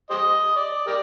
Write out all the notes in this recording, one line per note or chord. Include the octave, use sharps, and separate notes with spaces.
G4 C5 D#5
D5
G4 A#4 D5